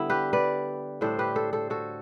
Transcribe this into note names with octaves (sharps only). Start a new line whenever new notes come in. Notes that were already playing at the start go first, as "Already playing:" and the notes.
Already playing: D3 G3 B3 E4
G4 B4
B4 D5
A2 G3 D4 A4 C5
G4 B4
A4 C5
A4 C5
F#4 A4